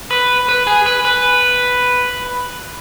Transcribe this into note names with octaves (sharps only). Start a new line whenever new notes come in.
B4
B4
G#4
B4
B4